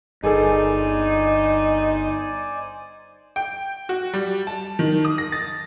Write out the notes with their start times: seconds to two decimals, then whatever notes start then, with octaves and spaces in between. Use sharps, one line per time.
0.23 G1 G2 D#4 G#4 A4 C5 D5 G#5
3.36 G5
3.89 F#4
4.13 G3
4.47 A5
4.79 D#3
5.05 D#6
5.18 A#6
5.32 A6